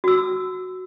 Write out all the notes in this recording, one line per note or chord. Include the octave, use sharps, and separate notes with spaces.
F#4 E6